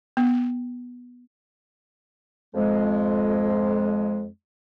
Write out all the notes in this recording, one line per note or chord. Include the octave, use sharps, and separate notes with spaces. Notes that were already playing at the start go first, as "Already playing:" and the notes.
B3
F2 G#3